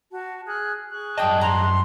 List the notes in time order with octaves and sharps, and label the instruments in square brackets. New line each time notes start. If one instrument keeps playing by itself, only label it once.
[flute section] F#4 A5
G#4 F6 F#6
G#4 C#6 F#6
[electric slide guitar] F#2 D5 A5 [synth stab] D#5 [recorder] G5
[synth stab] A#5 [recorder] C6